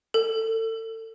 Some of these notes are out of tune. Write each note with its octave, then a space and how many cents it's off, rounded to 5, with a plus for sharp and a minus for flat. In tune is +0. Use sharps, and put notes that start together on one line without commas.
A4 +30